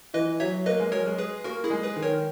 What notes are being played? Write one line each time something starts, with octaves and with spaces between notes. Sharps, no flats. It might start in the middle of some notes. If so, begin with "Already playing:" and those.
E3 B4 D#5
F#3 C#5 E5
A#3 B4 D#5
G#3
F#3 A#4 C#5
G#3
G#4 B4
A#3 F#4 A#4
E4 G#4
G#3
G#4 B4
D#3
A#4 C#5